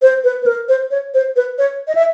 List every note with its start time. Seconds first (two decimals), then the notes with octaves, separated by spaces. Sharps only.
0.02 C5
0.24 B4
0.42 B4
0.46 A#4
0.69 C5
0.91 C#5
1.14 C5
1.36 B4
1.58 C#5
1.88 D#5
1.95 E5